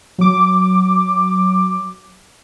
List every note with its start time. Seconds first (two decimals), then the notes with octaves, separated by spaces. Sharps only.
0.18 F#3 D6